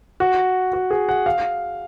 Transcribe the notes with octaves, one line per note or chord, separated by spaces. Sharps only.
F#4
F#4
G#4
F#5
F5